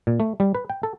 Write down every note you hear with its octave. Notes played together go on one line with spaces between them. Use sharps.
A#2
A3
G3
B4
G5
A4